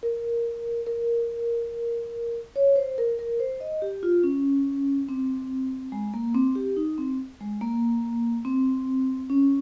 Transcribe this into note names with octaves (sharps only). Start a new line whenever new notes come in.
A#4
A#4
C#5
C5
A#4
A#4
C5
D#5
G4
F4
C#4
C4
G#3
A#3
C4
G4
D#4
C4
G#3
A#3
C4
C#4